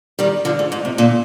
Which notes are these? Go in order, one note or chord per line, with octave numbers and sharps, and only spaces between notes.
D#3 G3
D3 F3
G#2
G#2
C3
A#2 D3